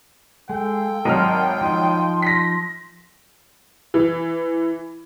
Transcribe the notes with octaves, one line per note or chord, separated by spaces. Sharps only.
G#3 A4 G5
G#1 F#3 A#4 D#5 A5 C6 F6
F3 D#4 C6
A#6 B6
E3